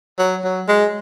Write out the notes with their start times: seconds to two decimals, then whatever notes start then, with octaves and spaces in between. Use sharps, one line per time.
0.19 F#3
0.44 F#3
0.68 G#3